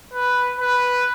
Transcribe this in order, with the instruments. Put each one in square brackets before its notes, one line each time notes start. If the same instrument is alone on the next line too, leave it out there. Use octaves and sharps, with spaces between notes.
[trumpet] B4
B4